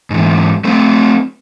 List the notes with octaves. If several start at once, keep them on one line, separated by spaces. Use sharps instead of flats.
G#2 E3
A3 C4